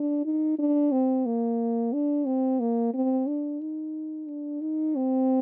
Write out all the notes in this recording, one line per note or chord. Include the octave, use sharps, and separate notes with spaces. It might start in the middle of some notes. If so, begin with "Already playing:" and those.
Already playing: D4
D#4
D4
C4
A#3
D4
C4
A#3
C4
D4
D#4
D4
D#4
C4